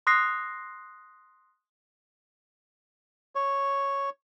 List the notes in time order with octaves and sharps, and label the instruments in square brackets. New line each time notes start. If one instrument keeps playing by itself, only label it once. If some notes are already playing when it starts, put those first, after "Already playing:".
[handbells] C6 D#6 F#6 A#6 C7
[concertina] C#5